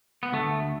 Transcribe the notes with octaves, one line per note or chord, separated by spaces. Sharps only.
B3
D2 A3